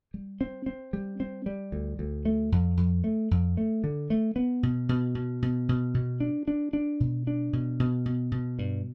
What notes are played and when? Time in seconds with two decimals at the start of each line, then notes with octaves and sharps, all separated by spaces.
0.14 G3
0.41 C4
0.66 C4
0.93 G3
1.20 C4
1.46 G3
1.72 D2
1.99 D2
2.25 A3
2.52 F2
2.77 F2
3.04 A3
3.31 F2
3.57 A3
3.84 D3
4.10 A3
4.36 B3
4.63 B2
4.89 B2
5.15 B2
5.42 B2
5.69 B2
5.94 B2
6.20 D4
6.48 D4
6.73 D4
7.00 B2
7.27 D4
7.53 B2
7.80 B2
8.06 B2
8.32 B2
8.59 G2